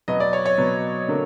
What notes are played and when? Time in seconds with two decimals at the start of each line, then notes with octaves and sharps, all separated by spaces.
0.08 B2 F#3 B3 D#5
0.20 D5
0.33 C#5
0.46 C#5
0.58 B2 F#3 B3
1.08 D3 F#3 A#3